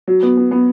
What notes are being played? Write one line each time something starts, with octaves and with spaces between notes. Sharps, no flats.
F#3
B3
B3
B3